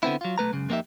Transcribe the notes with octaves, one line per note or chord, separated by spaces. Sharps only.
D3 B3 C4 E4
F#3 F4
B1 A3 B4 A#5
C#2 F#2 C#3
F2 A#3 C4 D#4 G4 E5